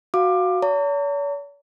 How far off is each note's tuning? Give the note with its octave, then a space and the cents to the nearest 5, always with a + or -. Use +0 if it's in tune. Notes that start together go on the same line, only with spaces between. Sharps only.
F#4 +0 F5 +0 D6 +20
C#5 +45 A#5 -45